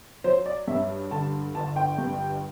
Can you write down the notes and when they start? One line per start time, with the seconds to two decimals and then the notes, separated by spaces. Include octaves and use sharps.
0.24 F#3 C5
0.46 D5
0.68 G2 E5
1.11 D3 A5
1.55 G1 A5
1.76 G5
1.98 G2